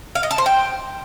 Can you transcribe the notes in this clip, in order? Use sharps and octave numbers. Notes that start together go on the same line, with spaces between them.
F5
D#5
A5
C5
G5